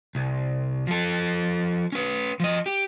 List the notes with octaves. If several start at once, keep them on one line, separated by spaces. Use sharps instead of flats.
C2
F3 A4
C#4 B4
F3 D#5
G4